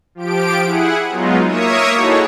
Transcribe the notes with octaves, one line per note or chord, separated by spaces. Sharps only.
F3 G4 D7
E4 G#4 F#5
F#3 G#3 B3 D#4 F4
A#3 A#4 C#5 E5 C#6 D#6
D#4 E4 F#4 G#4 A4 C#5